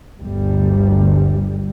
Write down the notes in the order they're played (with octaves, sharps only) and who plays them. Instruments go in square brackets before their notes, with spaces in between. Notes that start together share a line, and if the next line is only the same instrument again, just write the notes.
[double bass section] G1 D2 G3